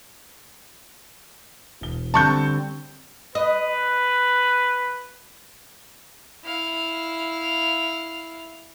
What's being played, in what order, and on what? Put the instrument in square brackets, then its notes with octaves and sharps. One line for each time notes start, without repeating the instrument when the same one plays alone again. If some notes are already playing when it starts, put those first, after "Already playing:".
[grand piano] E1 G7
[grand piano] D3 G3 C4 [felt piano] A5 C#6 G6
[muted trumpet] B4 [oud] D#5
[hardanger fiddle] E4 F5